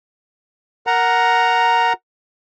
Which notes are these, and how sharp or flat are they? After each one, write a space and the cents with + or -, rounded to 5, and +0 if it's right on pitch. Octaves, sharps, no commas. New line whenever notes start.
A#4 +0 F#5 +0 A#5 +0